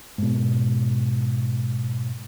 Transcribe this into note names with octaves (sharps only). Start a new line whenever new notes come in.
G#2 B2